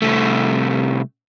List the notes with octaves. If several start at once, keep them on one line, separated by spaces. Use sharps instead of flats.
C2 A3